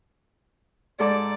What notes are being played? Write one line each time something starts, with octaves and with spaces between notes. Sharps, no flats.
G#2 A4 D5 D6